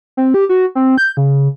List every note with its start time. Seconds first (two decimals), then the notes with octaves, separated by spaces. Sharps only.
0.17 C4
0.34 G4
0.49 F#4
0.75 C4
0.98 G6
1.17 C#3